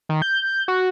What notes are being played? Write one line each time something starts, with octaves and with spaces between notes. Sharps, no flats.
D#3
G6
F#4